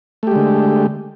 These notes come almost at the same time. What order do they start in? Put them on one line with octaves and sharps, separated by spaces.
A3 G4 G#3 D3